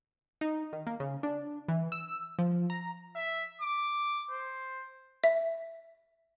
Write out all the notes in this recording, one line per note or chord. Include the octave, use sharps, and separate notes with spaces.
D#4
D#3
A#3
C#3
D4
E3
E6
F3
A#5
E5
D6
C5
E5